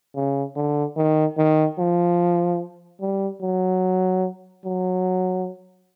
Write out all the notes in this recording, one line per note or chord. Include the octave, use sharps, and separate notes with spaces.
C#3
D3
D#3
D#3
F3
G3
F#3
F#3